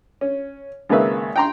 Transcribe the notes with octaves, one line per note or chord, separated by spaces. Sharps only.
C#4
G#1 C#3 A#3 B4 E5
G5 A#5 C6